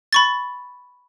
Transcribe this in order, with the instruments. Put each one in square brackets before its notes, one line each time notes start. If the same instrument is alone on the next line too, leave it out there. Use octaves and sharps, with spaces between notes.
[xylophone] B5 C#6 A6